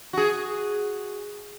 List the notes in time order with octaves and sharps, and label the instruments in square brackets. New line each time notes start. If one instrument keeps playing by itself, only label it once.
[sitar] F#4 G#4